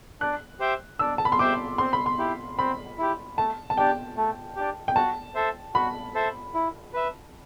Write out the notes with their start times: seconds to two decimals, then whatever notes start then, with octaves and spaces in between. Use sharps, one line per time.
0.21 D4 F#6
0.60 G4 C5 E5 G5
0.99 D4 E6
1.18 A5
1.25 B5
1.32 C6
1.39 G4 C5 E5 G5 D6
1.78 C4 C6
1.93 B5
2.06 C6
2.18 E4 G4
2.58 C4 B5
2.98 E4 G4
3.37 A3 A5
3.70 A5
3.77 D4 G4 G5
4.16 A3
4.56 D4 G4
4.88 G5
4.96 F#4 A5
5.35 A4 C5 E5
5.74 F#4 B5
6.15 A4 C5 E5
6.54 E4
6.94 B4 E5